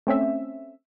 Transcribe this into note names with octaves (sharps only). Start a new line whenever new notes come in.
A3 C4 C#4 E5